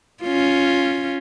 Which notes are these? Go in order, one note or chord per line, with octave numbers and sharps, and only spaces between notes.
C#4 F4